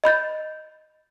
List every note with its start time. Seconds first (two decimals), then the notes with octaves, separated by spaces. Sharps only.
0.04 D#5 B5 G6 A6